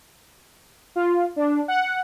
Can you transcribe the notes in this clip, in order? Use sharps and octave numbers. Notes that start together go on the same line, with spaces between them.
F4
D4
F#5